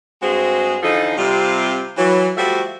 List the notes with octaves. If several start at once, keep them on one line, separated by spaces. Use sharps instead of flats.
G2 G#3 C4 F#4 G#4 C5
D3 E3 F3 D#4 A4
C3 G3 F4
E3 F#3
F3 G3 A3 F#4 E5